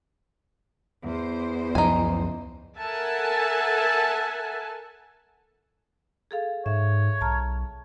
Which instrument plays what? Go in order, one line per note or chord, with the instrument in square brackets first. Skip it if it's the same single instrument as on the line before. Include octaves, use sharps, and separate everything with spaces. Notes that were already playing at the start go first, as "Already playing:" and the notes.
[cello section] E2 C5
[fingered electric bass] C#2 F#2 F3 [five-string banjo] D#4 G#5
[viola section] A4 A#4 E5 F#5 G#5 A5
[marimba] G#4 A4 F5
[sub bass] G#2 [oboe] C#5 [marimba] E5
[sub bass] B1 [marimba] A5 A#5 F6